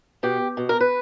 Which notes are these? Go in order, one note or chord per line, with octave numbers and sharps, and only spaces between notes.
B2 G4
B2
A#4
B4